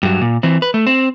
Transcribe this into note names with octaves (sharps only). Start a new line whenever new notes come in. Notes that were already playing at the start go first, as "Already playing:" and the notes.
G2 F#3
A#2
E3 C4
B4
A3
C4